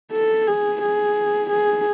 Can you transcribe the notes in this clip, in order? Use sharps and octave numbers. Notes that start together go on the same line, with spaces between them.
A4
G#4
G#4
G#4